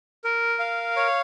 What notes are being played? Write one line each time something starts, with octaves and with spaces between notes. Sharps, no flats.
A#4
F5
C#5